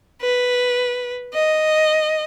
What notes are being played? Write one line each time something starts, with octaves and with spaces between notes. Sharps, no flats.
B4
D#5